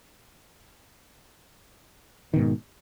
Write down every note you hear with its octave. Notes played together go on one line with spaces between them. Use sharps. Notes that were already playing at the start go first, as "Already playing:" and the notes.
G#2 B2 D#3